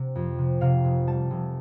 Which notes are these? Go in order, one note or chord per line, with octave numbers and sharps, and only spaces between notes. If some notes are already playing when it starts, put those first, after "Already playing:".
Already playing: C3
F2
C3
C3 F5
F1
G3 A5
F1